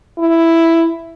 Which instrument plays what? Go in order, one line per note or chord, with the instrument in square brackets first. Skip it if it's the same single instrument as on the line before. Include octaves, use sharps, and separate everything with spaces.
[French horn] E4